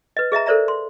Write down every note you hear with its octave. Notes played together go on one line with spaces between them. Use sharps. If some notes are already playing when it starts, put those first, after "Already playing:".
B4 D#5
G#4 D#5 E5 A#5
A4 A#4 C5 D5 E5 A#5
C6